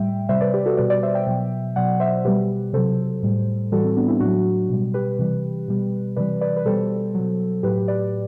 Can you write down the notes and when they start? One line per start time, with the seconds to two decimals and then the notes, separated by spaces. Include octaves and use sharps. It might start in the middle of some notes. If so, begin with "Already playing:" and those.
Already playing: A2 G3 E5 G5
0.29 C3 G3 C5 E5
0.41 B4 D5
0.54 G4 B4
0.66 F#4 A4
0.77 B2 G3 B4 D5
0.90 B4 D5
1.03 C5 E5
1.15 E5 G5
1.27 B2 F#3
1.76 B2 F#3 D5 F#5
2.00 C5 E5
2.25 B2 G3 G4 B4
2.73 C3 F#3 A4 C5
3.23 A2 G3
3.72 A2 E3 G3 F#4 A4
3.84 C4
3.97 B3 D4
4.08 C4 E4
4.20 A2 F#3 D4 F#4
4.70 B2 G3
4.94 G4 B4
5.19 C3 E3 G3
5.68 B2 G3
6.16 C3 E3 G3 B4 D5
6.41 B4 D5
6.57 B4
6.65 B2 G3 A4 C5
7.15 B2 F#3
7.63 A2 F#3 G4 B4
7.88 B4 D5